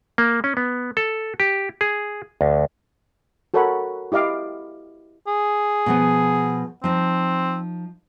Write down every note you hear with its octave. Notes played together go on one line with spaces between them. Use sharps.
A#3
C#4
B3
A4
G4
G#4
D2
F#4 A4 A#4 C#5 F#5 B5
E4 G4 D#5 F5 D6
G#4
B2 F3 B3
F3 C4 D#4